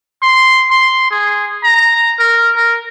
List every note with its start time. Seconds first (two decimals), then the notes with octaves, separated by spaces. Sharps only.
0.22 C6
0.70 C6
1.11 G#4
1.63 A#5
2.19 A#4
2.56 A#4